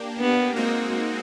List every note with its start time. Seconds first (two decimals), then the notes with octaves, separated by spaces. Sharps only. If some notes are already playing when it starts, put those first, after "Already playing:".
Already playing: A#3 D4 G4
0.19 B3
0.56 G#3 A#3 C4 D#4 F#4